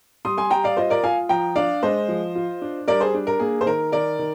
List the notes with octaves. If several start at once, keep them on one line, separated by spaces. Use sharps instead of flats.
G3 C6 D#6
G#5 C6
G3 G5 A#5
D5 F5
F4 C5 D#5
A#4 D5
F4 F5 G#5
F3 G5 A#5
D4 D5 F5
G#3 C5 D#5
F3
F4
D4
G3 A#4 D5
G#4 C5
D4
A#4
A#3 G#4
C5
D#3 A#4
D#3 A#4 D5
D#3